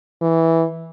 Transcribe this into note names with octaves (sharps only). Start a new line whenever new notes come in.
E3